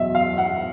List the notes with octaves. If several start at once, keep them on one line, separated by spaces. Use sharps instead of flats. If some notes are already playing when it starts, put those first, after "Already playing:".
Already playing: E2 B2 F#3 D#5 E5
F5
F#5